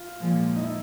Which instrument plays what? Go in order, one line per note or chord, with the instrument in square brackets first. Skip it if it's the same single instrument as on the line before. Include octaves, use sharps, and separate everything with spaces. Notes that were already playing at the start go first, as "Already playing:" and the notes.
Already playing: [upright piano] F4
[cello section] A#2 F3 G#3
[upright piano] D#4
E4